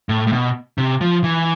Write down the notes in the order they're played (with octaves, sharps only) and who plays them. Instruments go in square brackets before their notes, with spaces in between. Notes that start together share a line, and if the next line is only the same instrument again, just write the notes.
[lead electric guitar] A2
A2
B2
C3
F3
E3